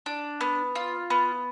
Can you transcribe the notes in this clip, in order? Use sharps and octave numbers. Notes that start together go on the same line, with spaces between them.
D4
B3
F4
B3